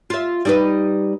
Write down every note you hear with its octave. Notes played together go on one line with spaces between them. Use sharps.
F4 E5
G3 D#4 B4